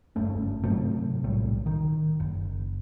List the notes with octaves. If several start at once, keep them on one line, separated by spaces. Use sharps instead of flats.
F#1 G2 A3 C#4
G#2 C3 F#3 A3
B1 A2 G3
D#3
F#1